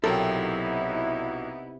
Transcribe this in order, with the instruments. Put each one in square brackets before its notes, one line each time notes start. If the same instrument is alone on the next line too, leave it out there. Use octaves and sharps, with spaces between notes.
[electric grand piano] B1 F#3 [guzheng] C3 [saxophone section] B3 D#4 E4 [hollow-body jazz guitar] A4 A#4